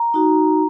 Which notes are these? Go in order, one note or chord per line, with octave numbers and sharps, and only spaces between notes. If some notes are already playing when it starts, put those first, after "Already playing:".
Already playing: A#5
D#4 F#4